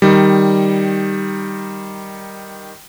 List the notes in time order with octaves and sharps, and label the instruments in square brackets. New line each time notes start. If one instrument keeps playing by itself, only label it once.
[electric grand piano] D#3 G3